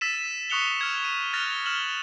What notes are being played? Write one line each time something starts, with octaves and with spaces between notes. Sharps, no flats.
E6 A6 B6 D#7 E7
C#6 D#6 F#6 C#7 F7 G7
F6 G#6
D#7
F6 F#6 A6 A#6 F7
F6 E7 F#7 G7